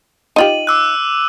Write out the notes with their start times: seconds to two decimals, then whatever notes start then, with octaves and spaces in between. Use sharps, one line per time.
0.36 D#4 F4 G4 D#7 F#7
0.67 D6 E6 F#6